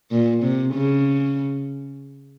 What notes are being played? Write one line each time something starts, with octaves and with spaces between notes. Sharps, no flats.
A#2
C3
C#3